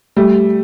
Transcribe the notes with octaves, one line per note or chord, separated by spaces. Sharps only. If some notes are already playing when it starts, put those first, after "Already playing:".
G3 A3